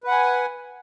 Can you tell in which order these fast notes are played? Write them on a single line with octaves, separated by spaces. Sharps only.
B4 F#5 G#5